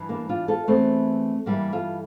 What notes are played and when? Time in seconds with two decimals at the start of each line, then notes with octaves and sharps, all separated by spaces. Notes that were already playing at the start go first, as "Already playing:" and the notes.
Already playing: G2 E3
0.09 A#3 D4
0.29 D4 F4
0.48 F4 A4
0.67 E2 E3 A3 C4
1.46 G2 E3 G3 A#3
1.73 F4 A4